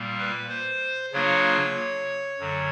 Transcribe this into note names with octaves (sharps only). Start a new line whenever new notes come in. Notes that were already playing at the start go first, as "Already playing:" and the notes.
Already playing: A#2 G3 A#3
B4
C5
C#3 F#3 A#3 D4 F4 C#5
F#2 D3 F#3